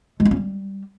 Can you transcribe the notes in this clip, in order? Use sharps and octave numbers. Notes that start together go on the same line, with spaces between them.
G#3
F4
C#4
G3